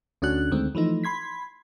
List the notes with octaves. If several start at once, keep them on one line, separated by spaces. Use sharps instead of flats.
D2 C#4 D4 F#4 F#6
D2 D#3 G#3 A3 C4
E3 F3 A3 D#4
B5 C6 G#6 B6